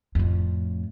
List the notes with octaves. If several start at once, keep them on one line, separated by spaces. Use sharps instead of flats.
F2 A2